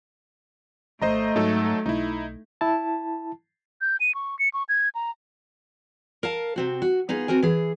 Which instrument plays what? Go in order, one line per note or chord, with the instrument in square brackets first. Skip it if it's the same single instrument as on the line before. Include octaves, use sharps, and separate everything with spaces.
[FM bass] G#1 [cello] A3 [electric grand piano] C5 D#5 A#5
[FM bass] G#2 [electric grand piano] F#3 D#4 A4
[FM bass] B1 [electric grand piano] D#4 E4
[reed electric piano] E4 A5
[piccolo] G6
D#7
C#6
C#7
C#6
G#6
A#5
[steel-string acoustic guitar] A#4 F5 A5
C3 C4 F#4
F#4
B3 D#4 F4 G#4
C4 F#4 A#4 G#5
E3 G#4